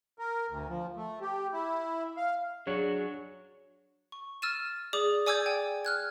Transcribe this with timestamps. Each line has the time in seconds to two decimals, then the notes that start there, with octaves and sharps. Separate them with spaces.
0.19 A#4
0.50 D2
0.69 F3
0.96 A3
1.21 G4
1.53 E4
2.17 F5
2.67 F#3 D4 F#4 G#4 C#5
4.12 C#6
4.42 E6 F6 A6 D#7 E7
4.93 G#4 D5 D6 D#6 F#7
5.26 D5 G#5 D6 E6 G6 G#6
5.46 G5 G#5
5.85 F6 F#6 G#6